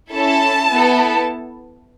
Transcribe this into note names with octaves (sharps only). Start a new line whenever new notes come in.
C#4 E4 A4 A5
B3 E4 A4